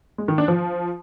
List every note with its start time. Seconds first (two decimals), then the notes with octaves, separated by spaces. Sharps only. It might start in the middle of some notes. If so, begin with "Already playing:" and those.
0.18 G#3
0.28 D#3
0.38 D4
0.48 F3